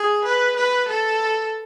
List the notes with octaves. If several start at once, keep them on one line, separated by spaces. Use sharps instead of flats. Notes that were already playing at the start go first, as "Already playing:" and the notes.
Already playing: G#4
B4
B4
A4